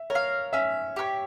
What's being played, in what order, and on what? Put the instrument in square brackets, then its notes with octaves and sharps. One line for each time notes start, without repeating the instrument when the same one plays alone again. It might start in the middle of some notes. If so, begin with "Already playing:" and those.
Already playing: [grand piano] E5
[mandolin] A#4 [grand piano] C#5
[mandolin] F5
[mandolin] C#4 [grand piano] E5
[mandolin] G4 A#4 C#5